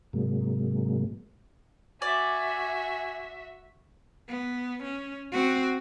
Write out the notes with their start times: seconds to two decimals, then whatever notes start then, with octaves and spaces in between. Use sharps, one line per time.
0.13 G#2 C3 F#3 G#3 A#3
2.02 F#4 D5 E5 G#5
4.28 B3
4.84 C#4
5.32 C4 F#4